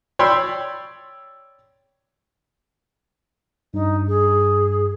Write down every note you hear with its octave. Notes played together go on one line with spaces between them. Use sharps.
C#5 D5 G5 B5 C6 E6
G2 D#4
G#4